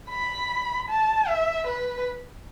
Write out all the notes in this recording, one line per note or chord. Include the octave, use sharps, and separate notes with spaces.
B5
A5
E5
B4